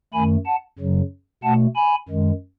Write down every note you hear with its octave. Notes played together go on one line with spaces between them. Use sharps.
F#2 D#3 A3 G#5 B5
F#5 A5
F#2 C#3 F#3
B2 A3 F#5 A5
G#5 B5
F#2 D#3 G#3